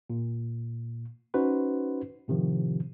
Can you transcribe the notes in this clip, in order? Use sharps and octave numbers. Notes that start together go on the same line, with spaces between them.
A#2
C#4 D#4 F#4 B4 C5
A2 C3 D#3 F3